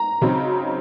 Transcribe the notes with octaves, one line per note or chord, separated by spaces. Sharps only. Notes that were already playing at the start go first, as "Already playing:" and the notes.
Already playing: A#5
C#3 F#3 C4 D#4